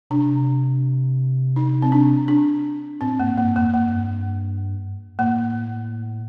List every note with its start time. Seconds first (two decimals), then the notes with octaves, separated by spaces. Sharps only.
0.10 C3 D4
1.56 D#4
1.82 C4
1.92 D4
2.28 D4
3.01 A2 C4
3.20 G2 A#3
3.37 G2 A#3
3.56 F2 A#3
3.73 G2 A#3
5.19 A2 A#3